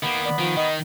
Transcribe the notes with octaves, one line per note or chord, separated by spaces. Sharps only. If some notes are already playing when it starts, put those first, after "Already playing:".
D#3 A#3 B3 B5
D5
D#3 F3
D#3 D#5